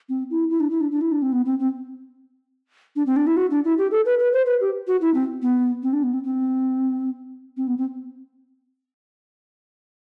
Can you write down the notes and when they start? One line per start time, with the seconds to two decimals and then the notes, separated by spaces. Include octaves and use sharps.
0.09 C4
0.30 E4
0.50 E4
0.60 D4
0.70 E4
0.81 D4
0.91 D4
1.01 E4
1.12 D4
1.22 C4
1.32 B3
1.46 C4
1.59 C4
2.96 D4
3.06 C4
3.16 D4
3.27 E4
3.37 F#4
3.51 D4
3.64 E4
3.78 G4
3.91 A4
4.06 B4
4.19 B4
4.33 C5
4.46 B4
4.60 G4
4.87 F#4
5.01 E4
5.14 C4
5.42 B3
5.83 C4
5.93 D4
6.03 B3
6.13 C4
6.24 C4
7.57 C4
7.67 B3
7.77 C4